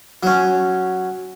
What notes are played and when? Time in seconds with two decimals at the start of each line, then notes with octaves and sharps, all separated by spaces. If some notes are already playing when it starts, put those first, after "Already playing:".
0.23 F#3 C#4